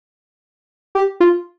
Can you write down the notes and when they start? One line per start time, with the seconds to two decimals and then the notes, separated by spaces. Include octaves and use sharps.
0.95 G4
1.20 F4